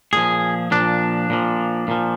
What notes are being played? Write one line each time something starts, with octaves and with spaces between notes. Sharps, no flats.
A#2 F3 G#4
A#2 F3 D4
A#2 F3
A#2 F3